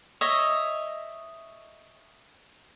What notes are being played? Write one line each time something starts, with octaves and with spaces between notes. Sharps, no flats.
C#5 D#5 E5